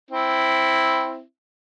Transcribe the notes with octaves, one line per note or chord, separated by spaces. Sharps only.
C4 E4